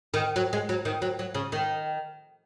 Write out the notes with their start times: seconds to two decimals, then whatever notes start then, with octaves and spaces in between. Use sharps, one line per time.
0.14 D#3
0.36 F#3
0.53 G#3
0.69 F#3
0.85 D#3
1.02 F#3
1.19 F#3
1.35 C#3
1.52 D#3